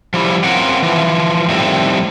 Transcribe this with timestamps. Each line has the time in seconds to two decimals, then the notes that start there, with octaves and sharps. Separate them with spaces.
0.14 F3 G3 E4
0.44 C4 C#4 F4 A#4 F#5
0.82 E3 F3
1.49 F2 A2 D#3 G3 A3 C4